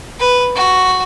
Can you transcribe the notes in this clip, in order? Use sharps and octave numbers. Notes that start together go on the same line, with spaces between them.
B4
F#4